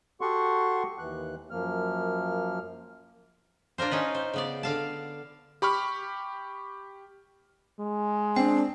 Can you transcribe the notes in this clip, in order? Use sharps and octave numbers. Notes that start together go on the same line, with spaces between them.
F#4 G4 A4 F#5 C6 C#6
D#2 E3 F#6
F#2 F3 A#3 F6
D4 F4 A#4 C5
C#4 D#4 B4
C5
C#3 B3 D5
D3 F5 A5
G4 B5 C#6 F6
G#3
C4 D4 G5